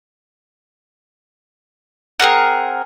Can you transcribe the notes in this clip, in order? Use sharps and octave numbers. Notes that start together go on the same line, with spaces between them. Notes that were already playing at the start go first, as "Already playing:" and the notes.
C4 G#4 A#4 F#5